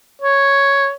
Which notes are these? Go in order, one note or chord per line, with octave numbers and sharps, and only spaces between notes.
C#5